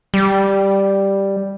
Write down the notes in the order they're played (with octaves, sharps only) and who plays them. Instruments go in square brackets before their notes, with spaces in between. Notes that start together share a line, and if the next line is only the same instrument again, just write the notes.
[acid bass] G3